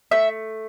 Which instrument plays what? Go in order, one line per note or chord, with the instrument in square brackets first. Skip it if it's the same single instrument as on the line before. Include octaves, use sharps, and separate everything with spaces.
[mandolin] A3 E5